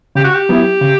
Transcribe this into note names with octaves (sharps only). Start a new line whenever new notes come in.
C#3 G4
F#4
G4
F#3 B3 E4
C#3